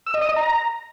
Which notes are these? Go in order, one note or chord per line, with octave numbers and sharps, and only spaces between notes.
E6
D#5
D#6
D#5
A#5